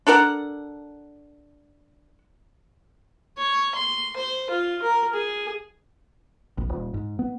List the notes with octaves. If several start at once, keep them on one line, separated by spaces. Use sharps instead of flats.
D4 A4 A#4 F#5
C#5
C6
C5
F4
A#4
G#4
A#1
D#1
G#2
B3